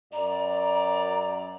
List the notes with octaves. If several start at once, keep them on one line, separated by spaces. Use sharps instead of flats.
F#2 D5 A#5